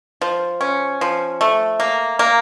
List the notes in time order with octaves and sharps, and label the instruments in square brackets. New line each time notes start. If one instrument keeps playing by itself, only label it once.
[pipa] F3
C#4
F3
A3
A#3
A#3